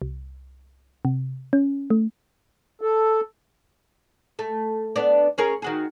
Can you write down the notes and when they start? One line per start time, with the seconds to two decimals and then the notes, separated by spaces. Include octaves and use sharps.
0.02 C2
1.05 C3
1.53 C#4
1.90 A3
2.81 A4
4.39 A3
4.96 B3 D4
5.38 C#4 G#4 A#4
5.62 D#3 F#4 G#4